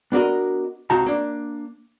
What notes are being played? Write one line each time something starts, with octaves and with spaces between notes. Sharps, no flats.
B3 D4 F#4 A#4 D#5
C#2 C3 D#4 F#4 A5 A#5
A#3 D4